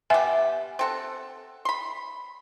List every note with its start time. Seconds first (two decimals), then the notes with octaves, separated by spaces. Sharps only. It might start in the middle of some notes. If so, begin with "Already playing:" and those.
0.10 B3 G4 E5 G#5
0.79 C4 A4 F#5
1.65 B5 C6